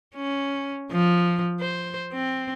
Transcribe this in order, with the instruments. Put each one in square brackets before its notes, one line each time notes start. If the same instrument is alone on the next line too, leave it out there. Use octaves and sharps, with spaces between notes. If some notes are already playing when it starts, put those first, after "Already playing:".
[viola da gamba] C#4
F3
C5
C4